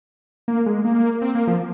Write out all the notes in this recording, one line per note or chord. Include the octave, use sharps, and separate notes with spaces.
A#3
G#3
A#3
C4
A#3
F3